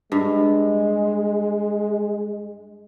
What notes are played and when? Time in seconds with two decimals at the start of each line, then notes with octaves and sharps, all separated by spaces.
0.12 G2 G#3